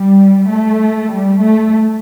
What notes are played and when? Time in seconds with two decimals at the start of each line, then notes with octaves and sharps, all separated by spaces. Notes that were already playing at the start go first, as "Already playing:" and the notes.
Already playing: G3
0.51 A3
1.10 G3
1.41 A3